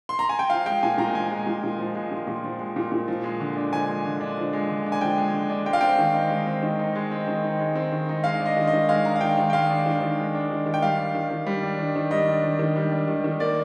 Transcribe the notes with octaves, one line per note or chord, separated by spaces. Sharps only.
C6
A#5
G#5
G5
F3 F5
G#3 G5
A#2 G#5
A#2 A#5
F3 G#5
G#3
A#2
A#2
F3
G#3
A#2
A#2
F3
G#3
A#2
A#2
F3
G#3
D3
D4
F3 G#5
G#3
D3
D4
F3
G#3
D3
D4
G#5
F3 G5
G#3
D3
D4
G#3 G5
F5
C4 G5
D#3
D#4
G#3
C4
D#3
D#4
G#3
C4
D#3
D#4
G#3
C4
D#3
D#4
G#3 F5
D4
D#5
D#3
D#5
D#3
G#3 F5
D4 A#5
F5
D#3 G5
D#3
G5
G#3 F5
D4
D#3
D#3
G#3
D4
D#3
D#3
G5
G3 F5
D4
D#3
D#3
G3
D4
D#3
D#3
G3 D#5
D4
D#3
D#3
G3
D4
D#3
D#3
A#3 D5